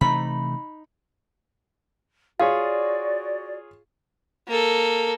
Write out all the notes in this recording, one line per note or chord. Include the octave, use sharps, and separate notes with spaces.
C3 E3 A3 D#4 B5
F4 F#4 G#4 C#5 D5 F5
A#3 A4